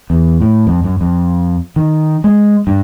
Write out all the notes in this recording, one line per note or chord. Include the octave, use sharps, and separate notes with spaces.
E2
A2
F2
F#2
F2
D#3
G#3
G2